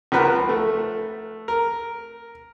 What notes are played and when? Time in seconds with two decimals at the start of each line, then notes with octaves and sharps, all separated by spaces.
0.12 C#2 F3 A#4 B4 F#5 F#6
0.49 A3
1.48 A#4